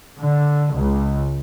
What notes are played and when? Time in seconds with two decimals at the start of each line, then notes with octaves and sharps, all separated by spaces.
0.20 D3
0.75 C#2